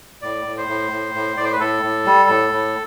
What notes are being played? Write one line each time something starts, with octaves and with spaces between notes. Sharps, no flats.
A2 D5
A2
C5
A2
A2
A2
A2 D5
C5
B4
A2 A4
A2
G3
A2
A2